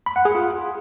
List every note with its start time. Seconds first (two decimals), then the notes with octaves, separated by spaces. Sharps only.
0.06 B5
0.16 F#5
0.25 G#4
0.35 F4